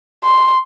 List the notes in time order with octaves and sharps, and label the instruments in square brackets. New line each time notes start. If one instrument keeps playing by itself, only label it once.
[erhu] C6